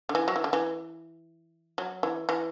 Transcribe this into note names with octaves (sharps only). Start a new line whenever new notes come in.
D3
E3
F#3
E3
D3
E3
F#3
E3
E3